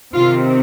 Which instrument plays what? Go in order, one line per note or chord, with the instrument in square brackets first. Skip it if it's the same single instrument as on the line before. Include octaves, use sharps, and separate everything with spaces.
[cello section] C3 D#3 C4 F4